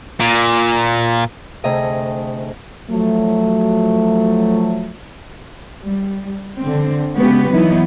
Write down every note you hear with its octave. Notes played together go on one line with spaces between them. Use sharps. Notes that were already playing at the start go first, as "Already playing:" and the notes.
A#2
D2 C3 A3 G#4 D#5 G5
F3 F#3 A3
G3
D3 C4
C#3 G#3 B3 F#4 G4 B4
E3 F#3 B3 D#4 E4